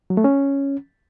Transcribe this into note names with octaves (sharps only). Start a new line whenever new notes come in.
F#3
A3
C#4